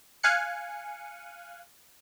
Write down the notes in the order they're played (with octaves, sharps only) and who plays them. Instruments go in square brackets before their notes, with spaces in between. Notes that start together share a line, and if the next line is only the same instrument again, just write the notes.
[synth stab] F5 G#5 F#6 C#7